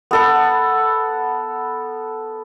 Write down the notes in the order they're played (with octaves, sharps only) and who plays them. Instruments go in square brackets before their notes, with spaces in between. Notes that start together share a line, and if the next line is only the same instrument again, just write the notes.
[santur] B3 A4 F#5